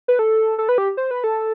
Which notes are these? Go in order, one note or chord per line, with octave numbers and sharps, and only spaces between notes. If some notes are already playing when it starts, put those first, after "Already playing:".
B4
A4
A4
B4
G4
C5
B4
A4